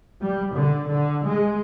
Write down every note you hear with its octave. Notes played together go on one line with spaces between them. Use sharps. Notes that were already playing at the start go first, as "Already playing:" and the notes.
G3
D3
D3
G#3